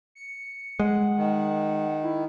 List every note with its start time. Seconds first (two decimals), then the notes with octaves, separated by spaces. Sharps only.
0.15 C#7
0.80 G#3 F#5
1.17 D#3
2.03 E4